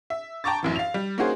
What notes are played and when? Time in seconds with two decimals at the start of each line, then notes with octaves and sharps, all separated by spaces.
0.10 E5
0.44 G5 A5 A#5 C#6 D6 A6
0.63 A1 F#2 E3
0.76 F5 F7
0.94 G3
1.18 A#3 C#4 D#4 F#4 G#4 C5